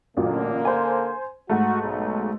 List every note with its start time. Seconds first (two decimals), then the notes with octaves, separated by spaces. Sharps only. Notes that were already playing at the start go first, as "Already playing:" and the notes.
0.17 A1 A#2 D3 F#3 A#3
0.65 C5 G#5
1.50 G#2 A3 F#4
1.81 B1